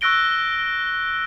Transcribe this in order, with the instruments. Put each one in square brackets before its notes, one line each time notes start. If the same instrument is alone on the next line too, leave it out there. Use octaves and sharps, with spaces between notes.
[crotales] C#6 E6 F#6 A#6 D7 G7